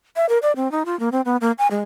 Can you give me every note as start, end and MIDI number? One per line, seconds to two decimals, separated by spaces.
0.16 0.26 76
0.29 0.38 70
0.42 0.52 74
0.56 0.70 60
0.71 0.83 63
0.85 0.98 65
1.00 1.09 58
1.12 1.21 60
1.25 1.37 59
1.41 1.52 58
1.58 1.67 80
1.71 1.83 56